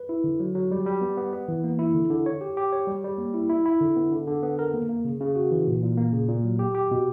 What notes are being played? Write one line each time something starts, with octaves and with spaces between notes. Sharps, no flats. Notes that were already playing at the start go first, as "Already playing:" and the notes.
Already playing: B4
E4
D3
F#3
F#3
G3
G3
B3
B3
B3
E3
A#3
E4
D3
D3
C#5
G4
G4
C#5
G3
G3
A#3
E4
E4
E4
D3
B3
D3
D3
B3
A#4
A#3
A#3
C#3
C#3
F#4
E3
A#2
A#2
A#3
C#3
A#2
F#3
G4
G4
B2